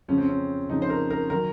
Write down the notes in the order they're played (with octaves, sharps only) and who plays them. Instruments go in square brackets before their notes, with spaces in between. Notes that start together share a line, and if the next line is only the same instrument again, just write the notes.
[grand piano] F2 C#3 F3 C#4
C4
C#4
F2 C#3 F3 D#4
C5
A#4
A#4
D#3 F#3 A#4